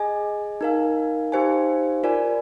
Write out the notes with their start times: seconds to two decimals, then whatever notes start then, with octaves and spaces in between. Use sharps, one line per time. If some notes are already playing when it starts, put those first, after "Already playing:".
Already playing: G#4 D#5 G#5
0.61 D#4 A#4 F5 G#5
1.32 D#4 G4 C5 F5 G#5
2.04 F4 A#4 D5 G#5